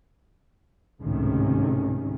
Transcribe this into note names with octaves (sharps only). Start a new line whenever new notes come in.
G#1 C#2 A2 C3 D#3 C#4